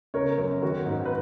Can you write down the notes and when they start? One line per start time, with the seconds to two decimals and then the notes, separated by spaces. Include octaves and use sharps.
0.14 C#3 A#4 C#5
0.38 F#2
0.62 D#3 F#4 A#4
0.86 G#2
1.05 B4